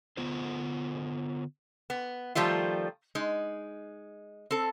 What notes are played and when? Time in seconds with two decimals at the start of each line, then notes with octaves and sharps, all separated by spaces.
0.17 D3 B3 F4 C5
1.90 B3
2.35 D#3 F3 G3 A3 F4
3.15 G#3 D#4
4.51 C4 A4